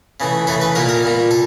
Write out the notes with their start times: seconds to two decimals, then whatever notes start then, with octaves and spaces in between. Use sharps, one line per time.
0.20 C#3 E3 A3
0.47 C#3 E3 A3 A4
0.61 B4
0.75 A#2 G3 A#3 A#4
0.89 A#4
1.03 A#2 G3 A#3
1.31 A4